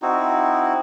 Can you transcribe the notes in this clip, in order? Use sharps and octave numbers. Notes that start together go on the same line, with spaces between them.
C4 D#4 E4 F#4